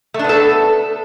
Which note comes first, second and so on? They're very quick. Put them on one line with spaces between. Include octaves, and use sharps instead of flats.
A3 D4 B3 A4